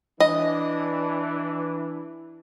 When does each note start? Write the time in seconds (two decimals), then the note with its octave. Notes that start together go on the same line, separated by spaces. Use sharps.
0.20 E3 D4 D#5